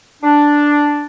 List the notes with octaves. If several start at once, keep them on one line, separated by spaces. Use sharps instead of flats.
D4